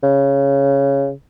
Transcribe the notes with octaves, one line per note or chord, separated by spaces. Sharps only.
C#3